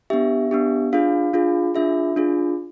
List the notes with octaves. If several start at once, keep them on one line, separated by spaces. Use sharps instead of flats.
B3 D4 G4 E5
B3 D4 G4
D4 F4 G#4 F5
D4 F4 G#4
D4 F4 G#4 E5
D4 F4 G#4